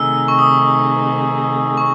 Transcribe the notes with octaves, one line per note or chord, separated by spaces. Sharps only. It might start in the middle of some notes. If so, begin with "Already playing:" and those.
Already playing: C3 D#3 A3 D#4 G#4 E6
C#6
D#6
C#6